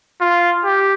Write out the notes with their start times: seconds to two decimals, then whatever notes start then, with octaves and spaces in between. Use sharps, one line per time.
0.21 F4
0.64 G4